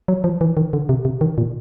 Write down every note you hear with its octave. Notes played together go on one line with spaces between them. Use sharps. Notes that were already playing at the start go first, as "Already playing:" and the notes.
F#3
F3
E3
D#3
D3
C3
C3
D#3
A#2